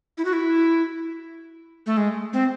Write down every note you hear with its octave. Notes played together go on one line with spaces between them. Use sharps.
E4
F#4
E4
A3
G#3
C4